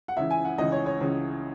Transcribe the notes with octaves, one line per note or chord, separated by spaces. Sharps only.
F#5
C#2 C#3 E3 E5
G#5
F#5
C#2 C#3 E3 D#5
C#5
C#5
C#2 C#3 E3